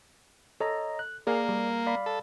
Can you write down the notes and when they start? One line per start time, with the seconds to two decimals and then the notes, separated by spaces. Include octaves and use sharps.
0.60 A4 C#5 D#5 A#5
0.99 F#6
1.27 A#3 G#4 A#4 D5 F5
1.49 G3
1.87 D5 F5 B5
2.06 A4